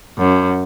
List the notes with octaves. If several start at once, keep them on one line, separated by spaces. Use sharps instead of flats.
F#2